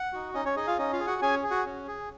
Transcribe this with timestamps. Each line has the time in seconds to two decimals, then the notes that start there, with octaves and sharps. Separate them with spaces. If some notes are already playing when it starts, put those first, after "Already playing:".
Already playing: F#5
0.13 D#4 F#4
0.34 C#4 D#4 D#5
0.45 C#4 C#5
0.56 D#4 G#4 D#5
0.67 F4 F5
0.78 C#4 D#4 D#5
0.93 F4 F5
1.00 G#4
1.07 F#4 F#5
1.22 C#4 G#4 G#5
1.43 G#4
1.51 F#4 F#5
1.65 C#4
1.87 G#4